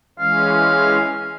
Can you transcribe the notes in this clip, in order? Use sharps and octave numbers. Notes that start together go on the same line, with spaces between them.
E3 G#3 C#4 F5